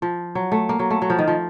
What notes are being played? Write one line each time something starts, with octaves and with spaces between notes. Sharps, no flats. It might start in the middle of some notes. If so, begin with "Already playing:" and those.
F3
F#3
A3
A#3
F#3
A3
F#3
F3
D#3
F3